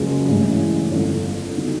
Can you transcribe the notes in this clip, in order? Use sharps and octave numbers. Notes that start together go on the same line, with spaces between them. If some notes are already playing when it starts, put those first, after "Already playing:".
Already playing: F#1 F#2 C#3 F3 G#3
A1 G2 E3 G#3
G1 F2 D3
D3 F#3 B3 D#4